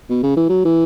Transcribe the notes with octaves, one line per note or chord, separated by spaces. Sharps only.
B2
C#3
E3
F#3
E3